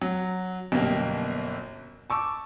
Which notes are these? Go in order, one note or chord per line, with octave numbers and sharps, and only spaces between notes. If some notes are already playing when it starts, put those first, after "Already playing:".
F#3
G1 F#2 B2 A#3 G4
A5 C#6 D6 E6